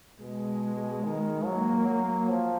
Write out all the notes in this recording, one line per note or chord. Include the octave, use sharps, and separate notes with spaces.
B2 G#3
D#3
F#3 A#3
F#3
F3